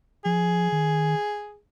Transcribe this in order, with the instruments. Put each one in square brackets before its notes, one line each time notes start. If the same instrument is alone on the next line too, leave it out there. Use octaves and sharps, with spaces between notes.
[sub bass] F3 [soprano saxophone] G#4
[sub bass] D#3